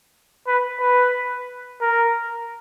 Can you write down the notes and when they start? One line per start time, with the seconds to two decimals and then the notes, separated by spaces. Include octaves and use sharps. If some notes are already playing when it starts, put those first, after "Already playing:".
0.47 B4
0.80 B4
1.81 A#4